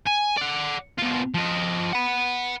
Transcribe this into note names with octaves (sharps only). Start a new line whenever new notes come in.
G#5
D5 F#5
B2 F4
F3 D#5
F#5 B5